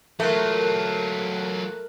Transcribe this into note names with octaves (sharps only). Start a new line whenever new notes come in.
F#3 A3 F4 A#4 F#6